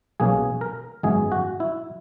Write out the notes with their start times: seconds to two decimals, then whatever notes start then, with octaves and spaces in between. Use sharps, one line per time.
0.20 B1 B2 A#3 C#4 G#4
0.61 A#4
1.03 G#1 F#2 E3 G#3 B3 G#4
1.32 F#4
1.60 E4